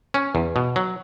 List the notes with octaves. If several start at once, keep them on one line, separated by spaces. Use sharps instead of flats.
C#4
E2
B2
F#3